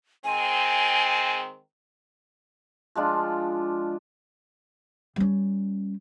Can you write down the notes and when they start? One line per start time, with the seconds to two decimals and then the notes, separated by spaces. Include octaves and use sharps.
0.24 D#3 G#3 C4 G#5
2.95 F3 G#3 D4 F4
5.16 G3 C#4